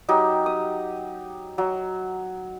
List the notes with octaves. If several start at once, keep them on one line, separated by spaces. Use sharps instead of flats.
F#3 D#4 G4
D#6
F#3